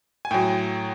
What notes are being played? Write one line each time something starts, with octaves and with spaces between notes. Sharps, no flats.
G#5
A2 F#3 G5